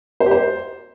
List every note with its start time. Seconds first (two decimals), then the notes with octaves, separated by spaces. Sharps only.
0.20 C5
0.26 G4
0.31 C5